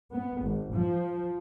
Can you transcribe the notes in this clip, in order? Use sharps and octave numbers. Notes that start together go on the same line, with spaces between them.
B3
G#1
F3